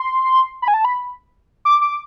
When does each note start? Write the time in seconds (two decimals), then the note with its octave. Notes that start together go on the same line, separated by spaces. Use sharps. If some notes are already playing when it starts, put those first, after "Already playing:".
Already playing: C6
0.62 B5
0.68 G#5
0.74 A5
0.85 B5
1.65 D6
1.81 D6